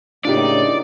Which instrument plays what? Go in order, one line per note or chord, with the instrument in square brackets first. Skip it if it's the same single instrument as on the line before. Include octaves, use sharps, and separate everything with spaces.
[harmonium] A2 C#3 A#3 [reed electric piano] D4 F4 G4 [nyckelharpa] D#4 [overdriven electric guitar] D5